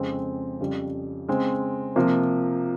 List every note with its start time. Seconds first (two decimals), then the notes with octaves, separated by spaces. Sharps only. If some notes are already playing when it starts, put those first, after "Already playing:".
Already playing: F2 C#3 G#3 C4
0.60 F2 C#3 G3
1.29 C#3 G#3 C4
1.96 C3 F3 A#3